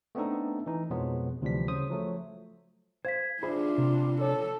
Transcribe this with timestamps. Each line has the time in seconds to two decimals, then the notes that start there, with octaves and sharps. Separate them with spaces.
0.15 A3 B3 C4 D4 D#4 A4
0.66 E3 D#4
0.90 F2 B2 F3 F#3 G#3 B3
1.42 D2 C3 E3 F3 G3 B6
1.68 C#3 F#3 C5 D#6
1.90 F3 F#3 A3
3.05 C5 F5 G#6 B6
3.43 D4 F4 G#4 C5 E5 B5
3.78 C3
4.21 A4 C#5